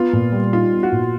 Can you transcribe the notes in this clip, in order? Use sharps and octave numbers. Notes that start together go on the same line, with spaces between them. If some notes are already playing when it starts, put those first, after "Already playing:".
Already playing: B3 F4
A#2
G3
D#4 F4
B3
F#4
A#2